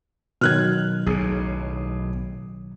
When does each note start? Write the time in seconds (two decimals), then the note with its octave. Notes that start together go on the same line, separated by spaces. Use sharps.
0.41 B2 D#3 F#3 F6 F#6 G#6
1.06 B1 A2 G#4